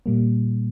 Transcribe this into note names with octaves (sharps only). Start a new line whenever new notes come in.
A#2 G3 A#3